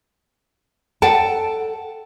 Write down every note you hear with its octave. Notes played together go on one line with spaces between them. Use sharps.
A4 F#5 G5 A5